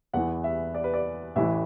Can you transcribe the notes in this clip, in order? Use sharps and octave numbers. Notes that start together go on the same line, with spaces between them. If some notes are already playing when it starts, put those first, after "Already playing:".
E2 E3 F#5
E5
D5
B4
D5
A1 A2 E3 E5